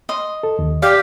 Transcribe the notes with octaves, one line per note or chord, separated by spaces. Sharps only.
D#5 C6
A4
D#2
G4 D5 F5 G6